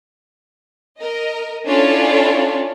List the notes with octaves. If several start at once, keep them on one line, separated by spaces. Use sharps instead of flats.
A#4 D#5
C#4 D4 E4 F4 A4 C#5